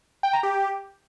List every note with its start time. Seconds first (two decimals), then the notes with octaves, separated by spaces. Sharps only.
0.23 G5
0.33 A#5
0.43 G4